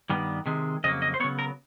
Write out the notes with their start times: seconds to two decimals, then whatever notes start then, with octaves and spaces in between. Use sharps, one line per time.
0.10 G2 D#3 G3 B3
0.46 C3 D#3 G#3
0.84 F2 C#3 F#3 A#3 D#5
1.02 D#5
1.14 C5
1.20 C#3 F#3 B3 C#5
1.39 A#4